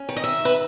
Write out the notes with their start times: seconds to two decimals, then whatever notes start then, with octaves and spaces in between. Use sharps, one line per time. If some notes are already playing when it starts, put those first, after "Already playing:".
Already playing: C#4
0.09 D#3
0.17 D#5
0.24 E5
0.45 B4